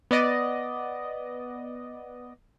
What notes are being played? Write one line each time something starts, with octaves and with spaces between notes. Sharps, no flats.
B3 D5 D#5